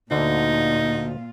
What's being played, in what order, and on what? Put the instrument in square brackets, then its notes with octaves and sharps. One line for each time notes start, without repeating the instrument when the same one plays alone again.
[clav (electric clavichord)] D2 D3 [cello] A#2 F4 [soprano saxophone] D#4